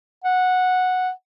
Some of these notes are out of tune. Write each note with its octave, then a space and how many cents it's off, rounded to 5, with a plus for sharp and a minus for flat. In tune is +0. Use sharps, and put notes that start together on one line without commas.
F#5 -10